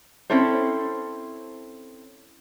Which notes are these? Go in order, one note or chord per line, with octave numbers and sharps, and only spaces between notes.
C4 C#4 E4 A4 C5